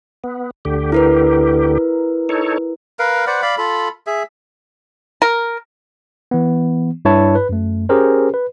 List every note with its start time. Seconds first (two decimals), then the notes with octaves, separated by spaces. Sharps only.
0.24 B3
0.65 D2 D3 G4
0.92 E4 A#4 B4
2.29 D#4 A4 C#5
2.99 A#4 B4 F5
3.27 B4 C5 D5 F#5
3.42 D5 F5 B5
3.58 F4 A4 B5
4.07 G#4 E5
5.22 A#4
6.31 E3 B3
7.05 G2 E4 C#5 A5
7.35 B4
7.49 F#2 A3
7.89 C#4 G4 G#4 A#4 C5
8.34 B4